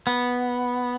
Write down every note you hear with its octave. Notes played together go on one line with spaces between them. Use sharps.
B3